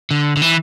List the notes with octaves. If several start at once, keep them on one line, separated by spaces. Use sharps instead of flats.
D3
D3
E3